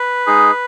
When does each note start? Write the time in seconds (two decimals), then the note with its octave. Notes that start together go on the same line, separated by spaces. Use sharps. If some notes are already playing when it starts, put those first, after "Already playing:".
Already playing: B4
0.27 G#3 D#4 G#4